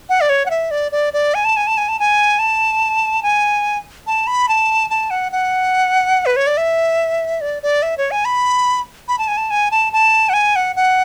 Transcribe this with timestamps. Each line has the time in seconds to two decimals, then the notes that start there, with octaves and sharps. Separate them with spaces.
0.09 F#5
0.21 D5
0.29 C#5
0.46 F#5
0.50 E5
0.71 D5
0.92 D5
1.13 D5
1.34 G#5
1.45 A5
1.57 G#5
1.67 A5
1.78 G#5
1.89 A5
2.00 G#5
2.39 A5
3.23 G#5
4.07 A5
4.27 B5
4.49 A5
4.90 A5
5.10 F#5
5.32 F#5
6.26 B4
6.36 C#5
6.47 D5
6.57 E5
7.41 D5
7.63 D5
7.83 E5
7.98 C#5
8.11 G#5
8.25 B5
9.08 B5
9.19 A5
9.28 G#5
9.37 A5
9.50 G#5
9.71 A5
9.93 A5
10.29 F#5
10.34 G#5
10.56 F#5
10.76 F#5